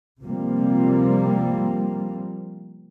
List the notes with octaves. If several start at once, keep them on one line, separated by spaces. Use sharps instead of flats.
C3 F3 G3 A#3 C4